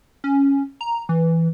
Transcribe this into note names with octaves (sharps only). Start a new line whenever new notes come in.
C#4
A#5
E3